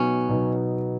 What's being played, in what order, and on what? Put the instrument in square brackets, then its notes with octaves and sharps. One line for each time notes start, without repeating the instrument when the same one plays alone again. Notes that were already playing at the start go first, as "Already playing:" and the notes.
Already playing: [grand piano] B2 F#3 B3 D#4 [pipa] C#4
[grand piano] B2 F#3 B3 D#4